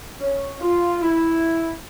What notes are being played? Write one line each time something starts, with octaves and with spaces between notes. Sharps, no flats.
C#4
F4
E4